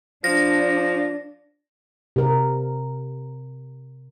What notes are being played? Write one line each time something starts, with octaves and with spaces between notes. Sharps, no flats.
F3 D4 A#6
C3 A#4